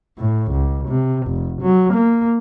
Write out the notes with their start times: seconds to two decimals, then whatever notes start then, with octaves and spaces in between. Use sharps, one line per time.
0.19 A2
0.51 C#2
0.88 C3
1.27 F1
1.62 F#3
1.93 A#3